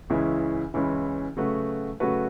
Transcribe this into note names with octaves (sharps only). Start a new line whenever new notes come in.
C#2 C#3 E3 C#4 E4
C#2 C#3 E3 C#4 E4
C#3 F#3 A3 F#4 B4
C#3 F#3 A3 F#4 B4